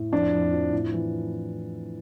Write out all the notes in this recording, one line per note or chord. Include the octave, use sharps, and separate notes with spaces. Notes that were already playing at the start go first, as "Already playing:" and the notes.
Already playing: A2
F2 D4
F2
F3
A2
E3